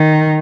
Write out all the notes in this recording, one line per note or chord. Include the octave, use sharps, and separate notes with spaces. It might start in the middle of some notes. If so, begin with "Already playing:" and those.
Already playing: D#3